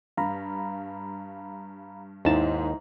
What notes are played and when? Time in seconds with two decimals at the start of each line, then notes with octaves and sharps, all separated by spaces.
0.17 G2 F5 A#5 B5
2.25 D#2 G#2 D#4 E4 A5 A#5